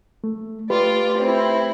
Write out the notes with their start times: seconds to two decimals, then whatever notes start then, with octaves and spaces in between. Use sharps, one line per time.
0.24 A3
0.70 A3 F4 G4 B4 D5
1.18 C4 E4